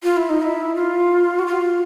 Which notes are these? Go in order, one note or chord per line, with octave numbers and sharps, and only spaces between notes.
F4
E4
D#4
E4
F4
F#4
F4